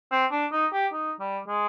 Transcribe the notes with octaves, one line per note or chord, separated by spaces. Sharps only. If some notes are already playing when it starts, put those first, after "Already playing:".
C4
D4
D#4
G4
D#4
G3
G#3